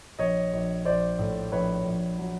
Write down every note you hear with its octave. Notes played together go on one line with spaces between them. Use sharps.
A#1 C#5 D#5
A#1
A#1 C5 D5
A2
A#1 B4 C#5
A#1
F#3